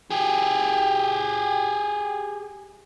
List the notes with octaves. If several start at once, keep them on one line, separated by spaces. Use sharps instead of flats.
G4 G#4